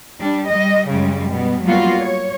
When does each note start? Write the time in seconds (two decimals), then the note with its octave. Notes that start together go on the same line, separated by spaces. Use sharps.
0.19 G3 D4
0.50 G3 D#5
0.88 F#2 C#3 G3 G#3
1.33 B2 G3 B3
1.64 F#3 G3 A#3 B3 F4 F#4
1.99 C#5